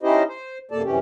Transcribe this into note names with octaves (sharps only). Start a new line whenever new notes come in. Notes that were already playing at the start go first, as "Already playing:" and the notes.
C#4 D#4 E4 G4 C5 D#5
C5
F#2 C3 A#3 A4 D5 A5
F#2 C3 E3 C#4 G4